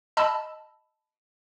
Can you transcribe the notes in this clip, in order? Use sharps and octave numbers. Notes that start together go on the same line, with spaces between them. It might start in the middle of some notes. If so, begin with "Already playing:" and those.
D#5 A5 B5 E6